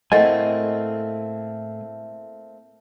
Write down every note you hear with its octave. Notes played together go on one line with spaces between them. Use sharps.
A2 A3 A#3 C4 D#5 F#5 G#5